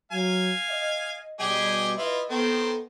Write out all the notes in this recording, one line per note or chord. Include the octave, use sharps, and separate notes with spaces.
F#3 F5 G#5
D#5
B2 G3 G4 G#4 D#5 G#5
E4 F4 B4 D#5
D#3 B3 C4 A4